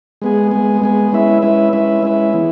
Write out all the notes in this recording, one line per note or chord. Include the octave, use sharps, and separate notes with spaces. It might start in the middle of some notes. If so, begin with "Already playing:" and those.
G#3 B3 G#4
G#3 B3 G#4
G#3 B3 G#4
G#3 C#4 E4 B4 E5
G#3 C#4 E4 B4 E5
G#3 C#4 E4 B4 E5
G#3 C#4 E4 B4 E5
E3 B3 E4